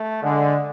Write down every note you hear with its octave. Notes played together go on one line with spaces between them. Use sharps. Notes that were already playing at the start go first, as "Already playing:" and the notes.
Already playing: A3
D3 G#3